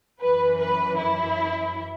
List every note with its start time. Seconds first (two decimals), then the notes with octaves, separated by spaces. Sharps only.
0.21 F#2 E3 B4
0.59 B4
0.98 E4